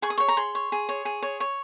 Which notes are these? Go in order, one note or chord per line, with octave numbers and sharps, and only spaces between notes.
G#4 C#6
D#6
C#5 C#6
A#5
G#4 C6
C#5
G#4
C#5
G#4
C#5
C#5